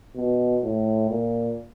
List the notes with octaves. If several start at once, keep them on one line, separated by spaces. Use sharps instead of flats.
B2
A2
A#2